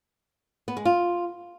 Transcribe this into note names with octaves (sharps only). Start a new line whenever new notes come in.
B3
G#3
F4